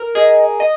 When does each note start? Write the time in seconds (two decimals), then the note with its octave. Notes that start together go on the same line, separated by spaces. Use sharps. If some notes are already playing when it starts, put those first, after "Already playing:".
Already playing: A#4
0.15 G#4 D#5
0.60 D#5